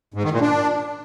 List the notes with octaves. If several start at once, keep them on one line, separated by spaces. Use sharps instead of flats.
G#2
D#3
A#2
D4